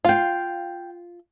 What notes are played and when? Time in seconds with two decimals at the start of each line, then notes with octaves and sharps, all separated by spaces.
0.05 F4 F5 G5